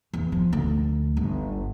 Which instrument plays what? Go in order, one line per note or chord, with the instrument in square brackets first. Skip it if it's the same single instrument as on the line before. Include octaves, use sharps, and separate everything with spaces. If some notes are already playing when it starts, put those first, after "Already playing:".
[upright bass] E2
F3
D2
G1